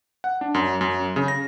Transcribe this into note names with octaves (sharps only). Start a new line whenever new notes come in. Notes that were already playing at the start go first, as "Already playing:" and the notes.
F#5
D4
F#2
F#2
C#3
A#6